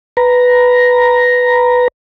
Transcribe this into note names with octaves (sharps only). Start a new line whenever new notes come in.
B4 A#5